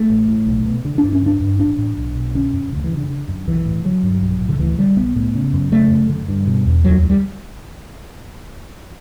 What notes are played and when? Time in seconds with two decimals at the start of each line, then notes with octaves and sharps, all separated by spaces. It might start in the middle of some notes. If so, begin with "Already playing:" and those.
Already playing: A3
0.10 A1
0.28 A2
0.47 B1
0.66 B2
0.85 D3
0.98 D4
1.03 G2
1.12 C#4
1.22 D3 D4
1.41 G2
1.59 A1 D4
1.78 A2
1.97 B1
2.15 B2
2.35 D3 C#4
2.53 F#2
2.72 D2 D3
2.84 E3
2.91 C#3
2.97 D3
3.09 D3
3.28 F#2
3.47 B1 E3
3.65 A2
3.85 D3 F#3
4.03 G2
4.22 B1
4.41 A2
4.49 D3
4.59 D2 E3
4.78 D3 G3
4.97 B1 B3
5.15 A2
5.35 C#3
5.53 F#2
5.72 C#3 A3
5.91 F#2
6.09 D3
6.28 G2
6.47 B2
6.65 E2
6.84 D2 F#3
7.03 D3
7.09 G3